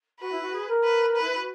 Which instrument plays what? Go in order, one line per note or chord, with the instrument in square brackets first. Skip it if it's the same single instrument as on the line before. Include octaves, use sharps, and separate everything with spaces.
[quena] F#4 [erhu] B4
[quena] E4
F#4
G#4
A#4
[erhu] B4
B4
[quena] E4
F#4